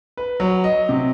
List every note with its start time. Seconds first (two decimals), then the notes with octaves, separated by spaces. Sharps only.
0.17 B4
0.40 F#3
0.64 D#5
0.89 C3